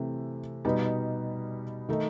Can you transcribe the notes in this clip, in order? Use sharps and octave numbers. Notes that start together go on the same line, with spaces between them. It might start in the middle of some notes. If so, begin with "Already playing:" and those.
Already playing: C3 E3 A3 C4
B2 G3 B3 D#4
D#3 A3 D#4